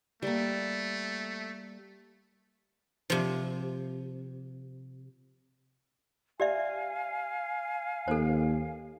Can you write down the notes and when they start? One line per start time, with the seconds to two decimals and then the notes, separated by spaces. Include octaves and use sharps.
0.22 G3 A3 A#3
3.10 C3 F3
6.40 G4 D5 E5 F5 G#5
8.08 D#2 A4 C5